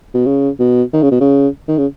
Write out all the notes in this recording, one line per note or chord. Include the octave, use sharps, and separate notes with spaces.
B2
C#3
B2
D#3
C#3
B2
C#3
D#3
C#3